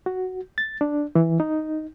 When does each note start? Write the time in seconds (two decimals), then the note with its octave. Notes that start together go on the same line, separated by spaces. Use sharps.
0.06 F#4
0.58 A6
0.81 D4
1.15 E3
1.40 D#4